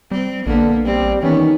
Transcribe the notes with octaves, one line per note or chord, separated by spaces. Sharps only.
G3 C4
A#1 D3 A#3 B3
G3 C4
D#3 E3 B3 C#4